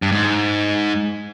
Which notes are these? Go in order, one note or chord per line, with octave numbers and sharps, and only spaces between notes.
G2
G#2